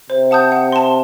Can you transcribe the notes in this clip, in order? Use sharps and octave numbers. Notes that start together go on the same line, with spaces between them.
C3 C5
F#5 A5 D#6 G6
F#5
A5 C6